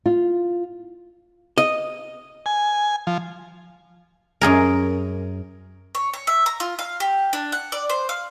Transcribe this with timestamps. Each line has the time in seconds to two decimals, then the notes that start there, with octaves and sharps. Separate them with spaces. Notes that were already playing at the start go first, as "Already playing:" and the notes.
0.06 F4
1.58 D#5
2.46 G#5
3.07 F3
4.41 F#2 G#4 A#4
5.95 C#5
6.14 C#5
6.27 E5
6.46 A#5
6.60 F4
6.79 F5
7.00 G4
7.33 D4
7.52 F#5
7.72 D5
7.90 C5
8.09 F5